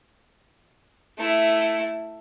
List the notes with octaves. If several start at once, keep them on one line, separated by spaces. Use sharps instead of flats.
A3 E4